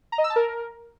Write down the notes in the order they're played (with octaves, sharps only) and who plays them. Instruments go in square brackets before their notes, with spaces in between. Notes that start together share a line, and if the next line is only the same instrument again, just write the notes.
[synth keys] A#5
D#5
E6
A5
A#4